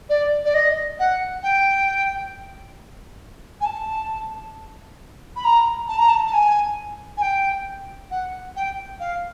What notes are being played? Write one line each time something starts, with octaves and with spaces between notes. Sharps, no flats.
D5
D5
D#5
F#5
G5
G#5
A5
B5
A#5
A5
A#5
A5
A5
G#5
G#5
G5
F#5
G5
F5